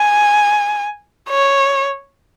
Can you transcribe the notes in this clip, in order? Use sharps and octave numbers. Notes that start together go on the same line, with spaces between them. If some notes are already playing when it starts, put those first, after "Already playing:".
Already playing: G#5
C#5